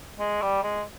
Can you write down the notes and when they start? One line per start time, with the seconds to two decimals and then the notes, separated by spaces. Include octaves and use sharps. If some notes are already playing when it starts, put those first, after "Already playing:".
0.19 G#3
0.42 G3
0.63 G#3